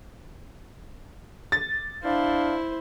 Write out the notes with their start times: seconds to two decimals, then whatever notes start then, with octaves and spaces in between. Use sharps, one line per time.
1.52 A6
2.04 D4 E4 C5 F5